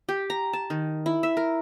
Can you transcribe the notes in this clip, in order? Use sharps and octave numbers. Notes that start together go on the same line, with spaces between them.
G4
A#5
A5
D#3
E4
E5
A#4